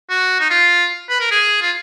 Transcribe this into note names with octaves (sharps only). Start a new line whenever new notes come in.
F#4
D#4
F4
B4
A#4
G#4
F4